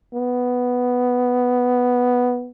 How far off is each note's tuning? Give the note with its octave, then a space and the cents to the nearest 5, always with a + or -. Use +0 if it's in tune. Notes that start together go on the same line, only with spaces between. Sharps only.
B3 +0